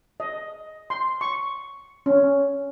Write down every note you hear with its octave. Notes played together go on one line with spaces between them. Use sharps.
D#5
C6
C#6
C#4